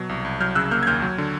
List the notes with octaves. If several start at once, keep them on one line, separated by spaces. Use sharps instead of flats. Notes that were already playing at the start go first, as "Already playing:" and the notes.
Already playing: B2 F#3
C2
C2
F#3 F6 G6
C#3 E6 F#6
A#3 F6 G6
G#6
D#2 F6 G6
F#3
D3